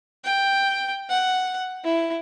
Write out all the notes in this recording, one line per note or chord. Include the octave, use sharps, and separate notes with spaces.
G5
F#5
E4